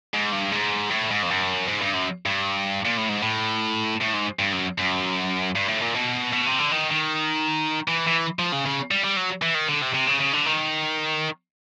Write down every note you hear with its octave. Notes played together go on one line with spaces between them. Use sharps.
G#2
G2
G#2
A2
G#2
F2
F#2
G#2
G2
F#2
G2
A#2
A2
G#2
A2
A2
G#2
G2
F#2
F#2
G2
A2
A#2
B2
B2
C3
D3
D#3
D#3
E3
E3
F3
C#3
C#3
G3
G3
F#3
E3
D#3
D3
C3
C3
C#3
C#3
D3
D#3